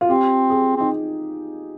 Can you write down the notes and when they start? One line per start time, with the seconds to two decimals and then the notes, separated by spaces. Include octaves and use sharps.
0.01 F4
0.08 C4 G4
0.50 G#4
0.77 C4 D#4